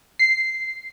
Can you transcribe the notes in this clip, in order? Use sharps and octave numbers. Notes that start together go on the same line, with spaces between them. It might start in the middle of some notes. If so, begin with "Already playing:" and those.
C7